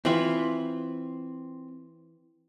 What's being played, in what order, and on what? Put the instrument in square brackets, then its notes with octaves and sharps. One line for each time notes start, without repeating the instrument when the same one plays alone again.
[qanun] E3 B5 C#6 [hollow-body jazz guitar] C4 F4